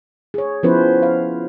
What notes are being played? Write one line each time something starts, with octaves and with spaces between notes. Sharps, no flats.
G#4 C#5
F3 B3 C#4 E4 B4 C5
F5